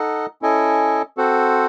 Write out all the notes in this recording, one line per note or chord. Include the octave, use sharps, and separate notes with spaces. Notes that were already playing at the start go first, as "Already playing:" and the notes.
Already playing: D#4 A4 D#5 F#5
C#4 E4 A4 D#5 G#5
C4 F#4 A4 C5 F#5